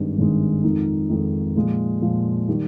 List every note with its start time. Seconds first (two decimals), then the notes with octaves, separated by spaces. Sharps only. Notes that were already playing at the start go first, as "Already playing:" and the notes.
Already playing: G#1 G2 D#3 G#3
0.18 G#1 G2 D#3 G#3
0.63 F2 D#3 G#3 D#4
1.09 F2 D#3 G#3 D#4
1.56 A#2 F3 G#3
2.02 A#2 F3 G#3
2.48 D#3 G3